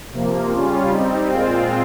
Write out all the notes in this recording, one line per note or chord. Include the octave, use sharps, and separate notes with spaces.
C3 F3 A#3
C#3 G3 C#4 F4
G3 C4 D#4
A#2 G#3 C4 F4